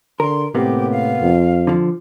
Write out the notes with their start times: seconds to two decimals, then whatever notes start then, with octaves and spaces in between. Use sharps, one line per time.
0.20 D3 A#4 C6
0.55 A2 C3 A#3 B3 G4
0.92 F5
1.21 F2
1.67 D3 F3